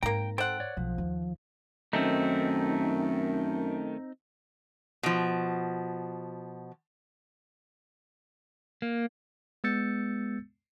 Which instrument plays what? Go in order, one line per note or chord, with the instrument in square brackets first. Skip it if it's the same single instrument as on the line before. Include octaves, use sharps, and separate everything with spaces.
[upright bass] G#2 C4 [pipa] A#3 A#5 [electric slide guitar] G5
[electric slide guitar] A4 G5 [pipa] C5 F#5
[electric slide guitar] C#5 D5
[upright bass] B1 [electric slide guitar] F3
[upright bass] D#2
[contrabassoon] F#2 [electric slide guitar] D#3 A3 [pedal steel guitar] C4 D#4
[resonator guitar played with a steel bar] B2 F3
[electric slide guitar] A#3
[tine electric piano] G#3 B3 E6 G6 A6 C#7